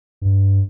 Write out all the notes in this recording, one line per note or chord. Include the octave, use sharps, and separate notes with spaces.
G2